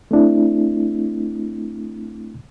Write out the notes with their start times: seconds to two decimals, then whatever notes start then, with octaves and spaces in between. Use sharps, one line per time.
0.11 A3 C4 D4 E4